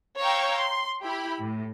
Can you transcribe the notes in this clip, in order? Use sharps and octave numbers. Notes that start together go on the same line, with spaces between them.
C#5 F5 G5 A#5 C#6 E6
C6
E4 G4 B5
A2